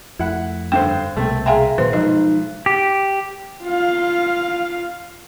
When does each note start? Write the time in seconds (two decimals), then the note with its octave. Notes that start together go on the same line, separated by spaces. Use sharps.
0.19 F2 A3 E4 F#5
0.72 G2 D3 C5 G5
1.17 C2 B2 A3 A#3 C4
1.46 G#4 E5 F5 G5 G#5 A#5 C6
1.78 A#2 D#3 F#3 D#4 B4 C5 C6
1.93 B1 F3 F#3 G#3 D#4 D#5
2.66 G4
3.64 F4 F5